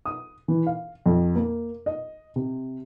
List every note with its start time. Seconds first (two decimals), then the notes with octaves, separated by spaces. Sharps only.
0.06 D#6
0.48 E3
0.67 F5
1.06 F2
1.36 A#3
1.86 D#5
2.36 C3